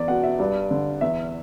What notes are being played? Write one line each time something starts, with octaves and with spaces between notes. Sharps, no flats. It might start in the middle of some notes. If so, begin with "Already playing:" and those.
Already playing: E2 D5
B2 F#5
E5
G2 D5
D3
E2 E5